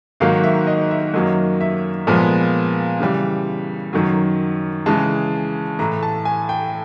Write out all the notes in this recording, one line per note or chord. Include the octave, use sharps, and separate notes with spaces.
G#2 D#3 F#3 A#3 F5
E5
D#5
E5
F#2 D#3 F#3 A#3 D#5
E5
A#2 F3 G#3 B3
C#3 E3 G3
F#2 D#3 F#3
C#3 E3 G#3 A5
A2 E3 A3 A#5
A5
G#5
G5